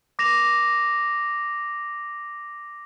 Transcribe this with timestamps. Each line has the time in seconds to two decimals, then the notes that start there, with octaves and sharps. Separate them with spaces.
0.19 D6 A#6 E7 F7